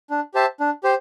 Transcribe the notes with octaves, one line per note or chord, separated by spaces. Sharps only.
D4
G4 C5 E5 A5
D4
G4 C5